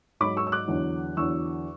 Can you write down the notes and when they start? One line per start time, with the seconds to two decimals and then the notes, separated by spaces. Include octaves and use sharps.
0.20 G#2 F#3 B5 D6
0.37 C#6 E6
0.47 E6
0.52 D6 F#6
0.68 E2 D3 F#3
1.17 E2 D3 F#3 C#6 E6